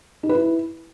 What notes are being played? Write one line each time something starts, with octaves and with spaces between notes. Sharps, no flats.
D#4
B4
E4